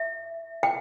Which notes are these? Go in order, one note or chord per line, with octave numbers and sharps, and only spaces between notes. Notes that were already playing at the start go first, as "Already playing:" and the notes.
Already playing: E5
G5